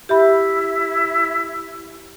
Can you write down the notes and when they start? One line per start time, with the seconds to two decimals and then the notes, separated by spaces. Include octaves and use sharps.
0.09 E4 G4 E5 B5